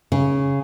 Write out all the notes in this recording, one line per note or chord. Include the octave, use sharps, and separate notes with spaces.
C#3